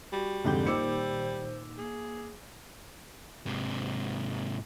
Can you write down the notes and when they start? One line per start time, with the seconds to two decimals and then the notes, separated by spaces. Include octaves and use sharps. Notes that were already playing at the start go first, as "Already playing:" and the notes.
0.13 G3 F#4
0.45 C2 F2 G#2 D3 G4 G6
0.66 A#2 D#3 C5 D6 E6 C#7
1.78 A#3 G#4
3.46 G#2 C3